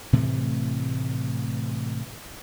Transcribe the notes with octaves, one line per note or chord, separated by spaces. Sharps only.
A2 C3 E3 A3